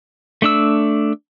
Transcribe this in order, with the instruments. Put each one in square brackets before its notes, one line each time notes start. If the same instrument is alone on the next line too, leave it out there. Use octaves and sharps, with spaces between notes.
[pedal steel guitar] A3 D4 E6